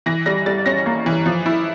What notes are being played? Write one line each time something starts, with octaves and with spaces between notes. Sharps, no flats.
E3 A#6
G3 A#6
G3 A6
C#4 A#6
A#3
E3
F3
E4